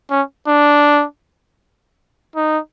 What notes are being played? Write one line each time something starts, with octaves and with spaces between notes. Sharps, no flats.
C#4
D4
D#4